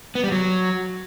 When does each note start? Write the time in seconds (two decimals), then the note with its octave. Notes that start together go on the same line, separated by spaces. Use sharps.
0.15 B3
0.24 G3
0.32 F#3